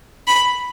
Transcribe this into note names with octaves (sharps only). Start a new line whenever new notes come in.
B5